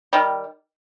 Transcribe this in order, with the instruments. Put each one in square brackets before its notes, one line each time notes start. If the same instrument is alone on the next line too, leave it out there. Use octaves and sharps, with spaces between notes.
[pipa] D#3 G3